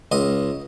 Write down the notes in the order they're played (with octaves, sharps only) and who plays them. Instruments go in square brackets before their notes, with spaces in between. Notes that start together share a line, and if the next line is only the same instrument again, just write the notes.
[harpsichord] C#2 D#5